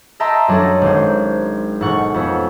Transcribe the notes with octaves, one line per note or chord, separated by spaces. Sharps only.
D#5 E5 G5 A5 A#5 C6
F#2 F#3 D4 A4 D#5
G#1 C5
E1 G#2 A4 F#5 C#6 F#6
F2 B3 C#4